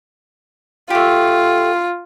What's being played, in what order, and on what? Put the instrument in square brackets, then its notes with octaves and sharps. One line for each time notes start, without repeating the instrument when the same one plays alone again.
[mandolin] A3 G4 [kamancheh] F4